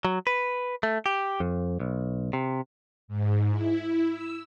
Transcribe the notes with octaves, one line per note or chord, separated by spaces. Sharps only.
F#3
B4
A3
G4
F2
B1
C3
G#2
E4
E6